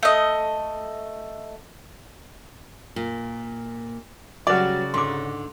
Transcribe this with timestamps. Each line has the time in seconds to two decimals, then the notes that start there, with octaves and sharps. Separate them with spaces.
0.03 A3 D#5
2.96 A#2
4.47 C#3 F#3 G3 F#4 B4 D5 D6
4.94 G#2 D3 C6 D6